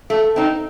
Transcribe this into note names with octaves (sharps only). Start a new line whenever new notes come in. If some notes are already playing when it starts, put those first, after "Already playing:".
A3
C4 D#4